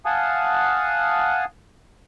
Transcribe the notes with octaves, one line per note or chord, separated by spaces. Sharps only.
F5 F#5 G#5 A5 D#6